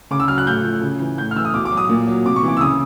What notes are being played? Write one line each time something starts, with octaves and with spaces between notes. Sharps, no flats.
C#3 D6
E6
F#3 F6
F#6
A2 G6
F3
C#3
E3
A2 G6
F6
E3 E6
D#6
B2 D6
D6
F#3
D#6
A#2
F#3
C3 D6
C#6
E3
D6
E6
C#3 D#6